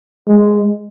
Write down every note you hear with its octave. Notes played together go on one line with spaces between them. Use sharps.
G#3